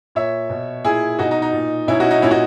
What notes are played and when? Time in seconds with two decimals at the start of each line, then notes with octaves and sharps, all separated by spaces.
0.15 A#2 C#5 E5
0.50 B2
0.84 A#2 E4 G#4
1.19 B2 D#4 F#4
1.31 D#4
1.42 D#4
1.53 A#2
1.88 B2 C#4 E4
2.00 D#4 F#4
2.11 D#4
2.22 A#2 C#4 E4
2.31 D#4 F#4